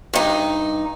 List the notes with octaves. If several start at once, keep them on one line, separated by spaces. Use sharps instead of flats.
G2 D#4